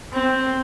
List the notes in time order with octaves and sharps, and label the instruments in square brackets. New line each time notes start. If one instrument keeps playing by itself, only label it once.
[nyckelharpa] C4